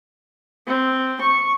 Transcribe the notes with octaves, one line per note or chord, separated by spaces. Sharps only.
C4
C#6